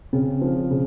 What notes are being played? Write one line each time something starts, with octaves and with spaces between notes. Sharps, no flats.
C#3 C4
F3
C#3